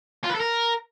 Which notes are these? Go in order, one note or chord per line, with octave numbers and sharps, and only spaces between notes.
F4
B4
A4
A#4